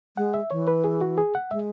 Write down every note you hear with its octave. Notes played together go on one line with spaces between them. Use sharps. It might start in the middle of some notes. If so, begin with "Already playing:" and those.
G#3 F#5
E5
E3 C#5
B4
G#4
F#4
G#4
F#5
G#3 E5